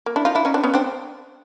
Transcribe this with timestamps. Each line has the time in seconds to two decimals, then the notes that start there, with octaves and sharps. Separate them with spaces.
0.06 A#3
0.16 D4 E4
0.25 D#4 F4
0.35 D4 E4
0.45 C#4 D#4
0.54 C4 D4
0.64 B3 C#4
0.74 C4 D4